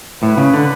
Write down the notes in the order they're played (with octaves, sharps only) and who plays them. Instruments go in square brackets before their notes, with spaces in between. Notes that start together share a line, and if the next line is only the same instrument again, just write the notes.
[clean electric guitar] A2 [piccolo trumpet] B4
[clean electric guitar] C#3
D3